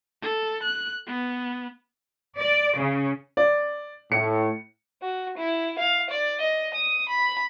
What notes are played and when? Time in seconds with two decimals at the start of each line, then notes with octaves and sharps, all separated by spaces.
0.23 A4
0.63 F#6
1.08 B3
2.38 D5
2.79 C#3
3.37 D5
4.12 A2 C#7
5.02 F#4
5.38 E4
5.78 F5
6.10 D5
6.41 D#5
6.74 D#6
7.09 B5